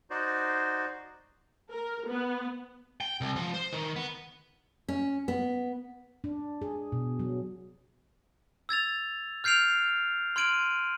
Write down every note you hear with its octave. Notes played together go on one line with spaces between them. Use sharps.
D#4 F#4 C5 D5
A#4
B3
G5
C2
F3
C5
D#3
B3
C#4
B3
D4
G#4
B2
F#3
E6 G#6 A6 F7
F6 G6 C7 D7 F7
C6 F6 G#6 D7 D#7 F#7